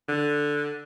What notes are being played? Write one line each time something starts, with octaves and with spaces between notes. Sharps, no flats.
D3